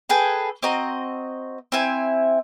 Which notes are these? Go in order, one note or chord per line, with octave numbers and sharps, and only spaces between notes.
G#4 A4 B4 G5
C4 F#4 D#5 A#5
C4 E4 E5 G#5